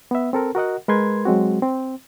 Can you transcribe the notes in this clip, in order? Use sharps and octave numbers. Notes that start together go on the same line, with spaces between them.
B3 E5
C4 A4 A#4
F#4 A#4 D#5 F#5
G#3 A#4 B4 C6 G#6
F#3 G#3 C4 F#4
C4